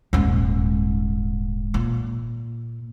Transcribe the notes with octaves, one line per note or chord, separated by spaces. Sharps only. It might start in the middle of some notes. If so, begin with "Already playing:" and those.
D#1 G#2
A#2